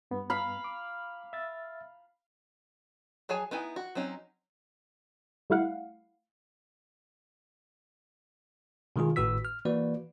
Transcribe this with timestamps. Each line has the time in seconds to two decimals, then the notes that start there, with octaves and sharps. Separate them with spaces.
0.11 G2 B3
0.30 F5 B5
0.64 D6
1.33 E5 A6
3.29 F#3 G#4 C#5 G#5 A5
3.51 B3 D#4 E4 G#5
3.76 F#4
3.95 F#3 C4 C#4 D#4
5.50 G3 A3 E4 F5 F#5
8.96 B2 D#3 G#3 F4 G#4
9.16 G#1 A2 F#4 B4 E6 B6
9.45 F6
9.65 E3 A#3 F#4 B4 D5